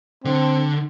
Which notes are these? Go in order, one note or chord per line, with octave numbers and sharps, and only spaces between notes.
D3 C4